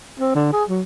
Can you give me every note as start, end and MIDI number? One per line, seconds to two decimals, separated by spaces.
0.20 0.34 60
0.35 0.50 50
0.53 0.63 68
0.69 0.82 54